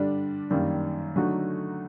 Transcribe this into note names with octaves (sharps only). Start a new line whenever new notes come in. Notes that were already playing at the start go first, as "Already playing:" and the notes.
Already playing: G2 D3 G3 D4
F#2 D#3 G3 A#3
D3 F#3 A3 D#4 F#4